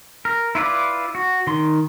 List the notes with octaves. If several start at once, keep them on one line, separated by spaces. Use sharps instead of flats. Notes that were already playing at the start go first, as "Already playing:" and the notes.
A#4
E4 F4 B4 D5
F#4
D#3 C6